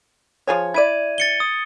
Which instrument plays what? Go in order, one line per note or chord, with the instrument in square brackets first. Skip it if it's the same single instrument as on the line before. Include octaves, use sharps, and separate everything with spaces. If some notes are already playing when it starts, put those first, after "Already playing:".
[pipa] F3 G#4 C#5
[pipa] E4 D5 [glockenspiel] G#6 D#7
[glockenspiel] A6 C#7 G7
D#6